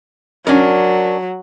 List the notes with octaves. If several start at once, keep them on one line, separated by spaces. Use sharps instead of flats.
F#3 C#4 D4 A#4